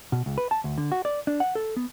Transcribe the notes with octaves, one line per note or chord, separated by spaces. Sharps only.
B2
C#2
B4
A5
D2
D3
F#4
D5
D4
F#5
A4
B3